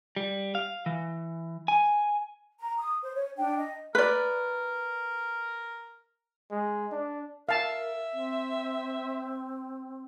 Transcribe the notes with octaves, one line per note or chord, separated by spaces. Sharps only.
G3
F5
E3
G#5
A#5
D#6
C5
C#5
D4 G5
D#5
A#4 B4 D5
G#3
D4
A#4 E5 F5 A5
C4